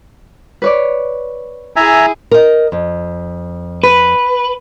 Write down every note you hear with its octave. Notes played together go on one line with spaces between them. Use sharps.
B4 C#5 D5
E4 G#4 E5 G#5 A#5
A#4 D#5
F2
B4